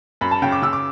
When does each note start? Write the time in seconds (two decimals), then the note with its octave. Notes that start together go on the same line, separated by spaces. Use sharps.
0.21 F#2 B5
0.31 A5
0.42 C#3 G5
0.52 D6
0.62 C#3 E6
0.73 D6